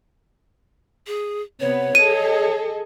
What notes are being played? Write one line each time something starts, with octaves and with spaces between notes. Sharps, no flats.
G#4
C3 B3 C#5
G#4 A4 D#5 D#7